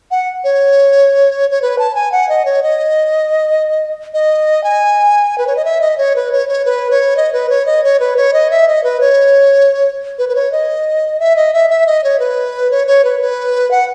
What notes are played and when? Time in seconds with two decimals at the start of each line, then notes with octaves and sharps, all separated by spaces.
0.11 F#5
0.44 C#5
1.51 C#5
1.62 B4
1.79 A5
1.95 G#5
2.12 F#5
2.29 D#5
2.45 C#5
2.63 D#5
4.14 D#5
4.64 G#5
5.38 B4
5.47 C#5
5.56 D#5
5.65 E5
5.81 D#5
5.98 C#5
6.16 B4
6.32 C#5
6.49 C#5
6.65 B4
6.91 C#5
7.17 D#5
7.33 B4
7.50 C#5
7.66 D#5
7.84 C#5
8.00 B4
8.17 C#5
8.33 D#5
8.51 E5
8.68 D#5
8.84 B4
9.01 C#5
10.19 B4
10.29 B4
10.35 C#5
10.52 D#5
11.20 E5
11.36 D#5
11.54 E5
11.70 E5
11.87 D#5
12.04 C#5
12.20 B4
12.71 C#5
12.87 C#5
13.05 B4
13.21 B4
13.71 F#5